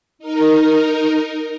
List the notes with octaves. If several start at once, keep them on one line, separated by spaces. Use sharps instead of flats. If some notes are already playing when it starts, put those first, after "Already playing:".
D#4 A#4